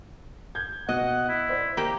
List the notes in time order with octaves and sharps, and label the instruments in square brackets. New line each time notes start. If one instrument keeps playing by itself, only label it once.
[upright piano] G6 G#6
[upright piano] B2 [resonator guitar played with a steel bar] D#5 [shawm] F#5
[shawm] E4
[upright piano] C5 D5
[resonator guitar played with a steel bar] A#3 G4 [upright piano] A#5